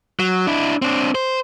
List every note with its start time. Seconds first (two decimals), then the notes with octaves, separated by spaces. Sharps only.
0.19 F#3
0.47 D4 E4
0.82 C4 D4
1.15 C5